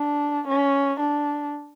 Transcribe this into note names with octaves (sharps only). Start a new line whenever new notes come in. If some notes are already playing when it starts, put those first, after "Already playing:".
Already playing: D4
C#4
D4